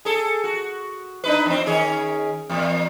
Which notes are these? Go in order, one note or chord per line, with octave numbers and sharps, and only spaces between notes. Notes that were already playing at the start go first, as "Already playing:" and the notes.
G#4 A4
F#4
D4 D#4 B4
E2 C4
D#3 C#4 G#4
E2 A#2